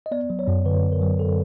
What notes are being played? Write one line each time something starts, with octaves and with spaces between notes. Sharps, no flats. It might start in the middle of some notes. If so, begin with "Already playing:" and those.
D#5
B3 D5
F#3
C#5
F#2
D3 B4
B3
A#4
F#3
A4